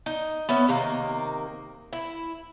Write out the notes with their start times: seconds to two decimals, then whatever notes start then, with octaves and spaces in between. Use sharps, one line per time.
0.06 D#4
0.49 B3 C#4 E5
0.68 C3 D#3 A#3
1.93 E4